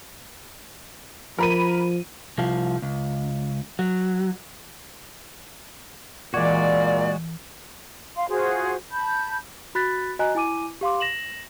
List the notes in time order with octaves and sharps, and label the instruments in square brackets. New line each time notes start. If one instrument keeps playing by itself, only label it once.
[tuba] F3 [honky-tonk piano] A#4 B5 D#7
[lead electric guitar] C2 F3
C#2
F#3
[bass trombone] A#2 [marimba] E3 D6 G#6 [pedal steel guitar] G#3 F#4 [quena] D5
[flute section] F5 C6
F4 F#4 G#4 C5
A5 B5 G6
[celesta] F#4 B5 F#6 A6 B6
F#4 D#5 G#5 A#5 F#6
E4 G#5 D6 D#7
G4 F5 C6 D6
A#6 E7 F#7